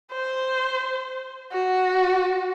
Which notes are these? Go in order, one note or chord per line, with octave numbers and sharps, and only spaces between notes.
C5
F#4